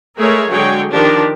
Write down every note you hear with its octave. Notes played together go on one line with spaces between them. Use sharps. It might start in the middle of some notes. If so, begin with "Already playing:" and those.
G#3 A3 G#4 A#4 C#5 E5
D3 F#3 G#3 G#4 C#5 G5
D#3 F3 D4 D#4 G4 A#4